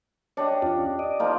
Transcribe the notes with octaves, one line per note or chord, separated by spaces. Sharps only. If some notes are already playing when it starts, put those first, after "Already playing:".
D4 G4 C#5 D#5
E2 C#4 F4
D5 D#5
F3 A#3 D#4